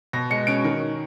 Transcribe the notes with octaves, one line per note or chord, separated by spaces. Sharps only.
B2 A#6
G#3 C#7
C#4 D7
D#3